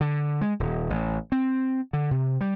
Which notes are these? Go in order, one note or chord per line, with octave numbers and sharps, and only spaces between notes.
D3
G#3
D#1
A1
C4
D3
C3
G3